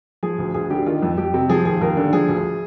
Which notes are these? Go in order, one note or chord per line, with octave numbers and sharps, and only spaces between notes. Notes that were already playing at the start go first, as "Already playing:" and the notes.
F3 G#4
D2
D2 G#4
D3 G4
D#3 F4
F2
F2 G4
C3
F3 G#4
D#2 G#4
D#2 A#4
D3
F3 G#4
D2